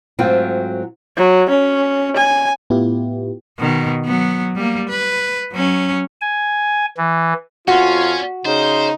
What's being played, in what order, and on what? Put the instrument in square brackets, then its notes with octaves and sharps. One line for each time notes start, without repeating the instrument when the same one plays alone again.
[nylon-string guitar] G#2 F#3 A3 C4 F4 G5
[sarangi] F#3
C#4
G#5
[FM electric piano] A2 B3 E4 F4 G4
[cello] B2 D#3
F#3 B3
G3 A#3
B4
F#3 C#4
[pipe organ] G#5
E3
[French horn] F2 [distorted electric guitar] C#4 [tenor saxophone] F4 [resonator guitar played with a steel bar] F#4
[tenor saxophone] C#3 [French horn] D#4 [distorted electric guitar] C5